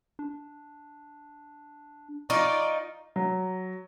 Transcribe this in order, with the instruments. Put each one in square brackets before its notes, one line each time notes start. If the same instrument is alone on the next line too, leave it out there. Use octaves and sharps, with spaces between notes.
[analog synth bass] D4
[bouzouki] D#4 F4 [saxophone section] D5 [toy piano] C#6
[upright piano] F#3